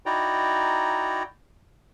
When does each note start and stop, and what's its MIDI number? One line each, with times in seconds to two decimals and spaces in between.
0.06 1.23 63
0.06 1.23 64
0.06 1.23 66
0.06 1.23 74
0.06 1.23 79
0.06 1.23 82